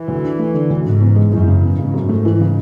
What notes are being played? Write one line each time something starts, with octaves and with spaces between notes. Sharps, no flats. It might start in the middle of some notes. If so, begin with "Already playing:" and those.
Already playing: E3
D2
D4
A3
D3
D2
G#2 C#3
E2
G#3
F#2 E3
C#3
E2
G#2 C#3
F#2
A3
E3
C#3